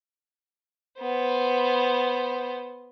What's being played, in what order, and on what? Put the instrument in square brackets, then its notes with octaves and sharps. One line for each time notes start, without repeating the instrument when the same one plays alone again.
[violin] B3 C5